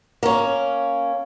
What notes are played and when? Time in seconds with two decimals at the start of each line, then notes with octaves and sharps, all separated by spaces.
0.23 A#3 C#4